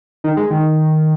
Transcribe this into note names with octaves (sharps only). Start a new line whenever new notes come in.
D#3
G#3
D#3